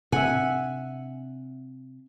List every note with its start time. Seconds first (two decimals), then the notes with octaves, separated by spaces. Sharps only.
0.12 C3 C4 D4 E5 F#5 G#5